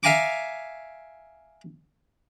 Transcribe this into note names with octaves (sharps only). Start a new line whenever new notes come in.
E5 F5 G#5 A#5 C#6 D6